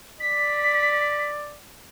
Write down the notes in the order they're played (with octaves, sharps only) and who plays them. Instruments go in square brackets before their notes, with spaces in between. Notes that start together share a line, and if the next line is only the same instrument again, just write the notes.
[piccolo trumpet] D5 [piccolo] B6